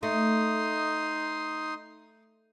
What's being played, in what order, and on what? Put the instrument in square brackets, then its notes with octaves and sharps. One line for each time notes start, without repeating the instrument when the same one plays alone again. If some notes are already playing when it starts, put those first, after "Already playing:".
[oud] A3 [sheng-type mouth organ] D#4 C6 D#6